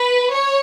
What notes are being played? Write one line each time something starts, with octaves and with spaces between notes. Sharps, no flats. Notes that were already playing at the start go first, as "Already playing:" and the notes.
Already playing: B4
C#5